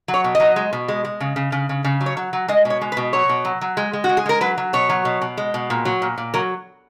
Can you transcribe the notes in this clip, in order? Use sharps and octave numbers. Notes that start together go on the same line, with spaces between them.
F#3
C#5
B2
F#3 D#5
G#3
B2
G#3
G#3
C#3
C#3
C#3
C#3
C#3
F#3
C#5
F#3
F#3
G#3 D#5
B2
C#5
G#3
B4
B2
F#3 C#5
B2
F#3
F#3
G#3
G#3
F#4
G#3
G#4
G#3 A#4
F#3 B4
F#3
B2 C#5
F#3
B2
B2
G#3
B2
A#2
F#3
A#2
A#2
F#3 A#4